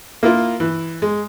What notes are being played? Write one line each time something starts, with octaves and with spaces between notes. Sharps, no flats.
A#3 E4 F4
E3
G#3